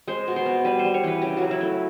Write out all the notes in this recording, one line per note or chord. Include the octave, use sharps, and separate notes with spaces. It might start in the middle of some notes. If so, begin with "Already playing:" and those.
G#3 C5
B2
C5
B3
G3 B4
C5
G3
C#5
E3 B4
C#3 G4
F#3 F#4
E4
A3